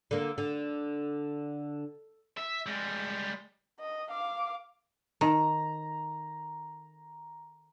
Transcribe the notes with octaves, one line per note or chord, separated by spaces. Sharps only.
D3 A#3
D3
E5
G3 G#3
D#5
F5 D6
D#3 A#5